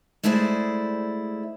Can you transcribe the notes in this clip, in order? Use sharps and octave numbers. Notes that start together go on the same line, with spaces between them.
G#3 A3 E4 G#4 C5 D5